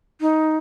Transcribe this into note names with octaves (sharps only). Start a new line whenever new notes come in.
D#4